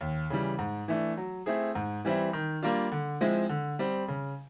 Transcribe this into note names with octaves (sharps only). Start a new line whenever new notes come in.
D#2
C#3 E3 G3
G#2
E3 A3 D4
F#3
A3 C4 E4 G#4
G#2
E3 G3 C4 E4
D#3
G3 A#3 D4 F4
D3
F3 G#3 C4 E4
D3
G3 C4
C#3